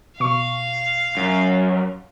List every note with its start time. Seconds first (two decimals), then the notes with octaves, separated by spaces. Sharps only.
0.20 B2 F5 C#6
1.17 F#2